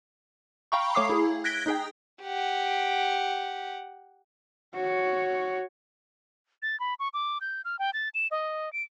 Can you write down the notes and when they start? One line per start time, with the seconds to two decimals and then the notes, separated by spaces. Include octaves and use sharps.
0.72 F5 G5 A#5 B5 C#6
0.95 A3 C#5 F5 D6 D#6 C7
1.09 E4 G#4
1.44 F#6 G#6 A#6 B6 D7 G7
1.66 D#4 G#4 G5
2.23 G4 F#5
4.75 F#4 C#5
6.62 A6
6.80 B5
6.99 C#6
7.14 D6
7.41 G6
7.65 F6
7.79 G5
7.94 A6
8.14 E7
8.31 D#5
8.73 D7